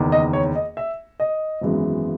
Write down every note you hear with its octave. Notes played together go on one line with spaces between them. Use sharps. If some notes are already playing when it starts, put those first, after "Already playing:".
Already playing: F#1 E2 D#3
D#5
C#5
D#5
E5
D#5
G#1 F#2 E3 G#3 B3